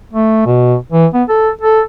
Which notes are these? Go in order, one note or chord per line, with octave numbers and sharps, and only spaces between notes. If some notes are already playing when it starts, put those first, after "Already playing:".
A3
B2
E3
B3
A4
A4